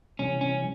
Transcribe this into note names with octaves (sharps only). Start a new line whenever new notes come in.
C3 E3 G3 C#4
C#4